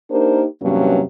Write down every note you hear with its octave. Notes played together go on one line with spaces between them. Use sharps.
A#3 D4 D#4 G4 A#4 C5
E2 G2 C3 F#3 A#3 C#4